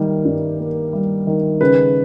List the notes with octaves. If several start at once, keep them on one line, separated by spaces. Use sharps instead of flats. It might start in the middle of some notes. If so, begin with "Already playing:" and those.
Already playing: D#3 G3 A#3
G2
A#3
G3
D#3
C#3 B4